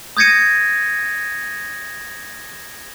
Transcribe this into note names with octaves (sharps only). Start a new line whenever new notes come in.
D#6 G6 G#6 A#6 C#7 D#7